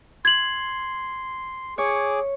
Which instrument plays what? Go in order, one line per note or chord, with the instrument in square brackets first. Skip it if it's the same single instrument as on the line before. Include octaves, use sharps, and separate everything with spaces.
[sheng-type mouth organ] C6 [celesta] G#6 F#7
[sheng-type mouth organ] G#4 D6 [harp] C#5